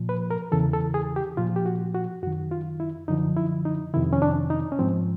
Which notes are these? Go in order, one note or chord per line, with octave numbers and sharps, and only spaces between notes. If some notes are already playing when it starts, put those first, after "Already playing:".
Already playing: A#2 F3
B4
A#4
E2 C#3 E3 A4
A4
G#4
G4
A#2 F3 F4
G4
F#4
F#4
F#2 D#3 F#4
F4
E4
F#2 D3 F3 D#4
E4
D#4
F2 C3 D#3 E4
C#4
D4
D#4
C#4
G#2 F3 C4